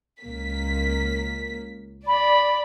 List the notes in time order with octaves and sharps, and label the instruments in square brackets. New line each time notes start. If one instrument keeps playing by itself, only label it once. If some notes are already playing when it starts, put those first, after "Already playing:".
[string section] C#2 A#3 B6
[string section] D5 [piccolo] B5